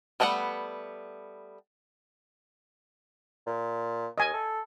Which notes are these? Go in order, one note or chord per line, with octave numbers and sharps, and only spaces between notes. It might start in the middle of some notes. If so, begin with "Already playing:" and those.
G3 A3 B3 A4 F#5
A#2
D#2 D#5 G#5
A4